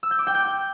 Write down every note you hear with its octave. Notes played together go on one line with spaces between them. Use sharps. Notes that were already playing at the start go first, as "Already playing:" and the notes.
E6
G6
D6
G5
G6